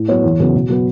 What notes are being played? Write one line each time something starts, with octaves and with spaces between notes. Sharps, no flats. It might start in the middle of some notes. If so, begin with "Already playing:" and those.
Already playing: A2
F#3 B3 C#5
E2
C#3 F#3 B3
B2
F#3 B3